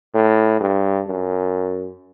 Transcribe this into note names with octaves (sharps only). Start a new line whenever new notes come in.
A2
G2
F#2